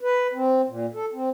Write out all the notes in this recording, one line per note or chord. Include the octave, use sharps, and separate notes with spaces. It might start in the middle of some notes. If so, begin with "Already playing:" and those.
B4
C4
A#2
A4
C4